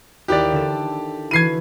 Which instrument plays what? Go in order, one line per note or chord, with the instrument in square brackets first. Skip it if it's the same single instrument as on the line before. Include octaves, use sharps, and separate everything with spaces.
[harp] D#2 E4 F#6 [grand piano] G4 D5
[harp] D3 A4
[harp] E3 E4 F#4 [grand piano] G#6 C7 D#7